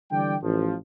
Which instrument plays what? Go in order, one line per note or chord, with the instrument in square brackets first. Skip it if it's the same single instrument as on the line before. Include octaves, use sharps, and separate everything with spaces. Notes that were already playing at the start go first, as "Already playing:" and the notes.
[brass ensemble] D3 E3 G3 D5 G5
A1 F3